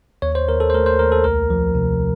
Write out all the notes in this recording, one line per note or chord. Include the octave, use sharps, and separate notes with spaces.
D#2 C#5
C5
D#2 A#4
A4
C5
A3 A#4
C5
D#2 A#4
A4
C2 A#4
F3
C3